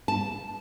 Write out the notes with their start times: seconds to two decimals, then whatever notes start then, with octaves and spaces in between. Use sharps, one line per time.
0.08 A5